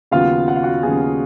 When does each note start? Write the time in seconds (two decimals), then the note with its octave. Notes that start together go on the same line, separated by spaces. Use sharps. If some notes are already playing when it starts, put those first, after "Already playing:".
0.11 D#2 C#3 F#3 B3 F4 F5
0.48 F#5
0.56 F5
0.63 F#4 F#5
0.83 D#2 C#3 F#3 B3 G#4 G#5